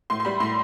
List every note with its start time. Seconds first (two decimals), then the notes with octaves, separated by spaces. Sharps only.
0.10 A2 C6
0.20 C6
0.25 G3 B5
0.40 A2 C6